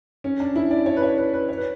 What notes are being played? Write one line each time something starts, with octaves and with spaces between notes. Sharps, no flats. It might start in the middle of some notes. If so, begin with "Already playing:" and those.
C#4
D4
E4
D5
C#5
B4
C#5
B4
B4
C#5
B4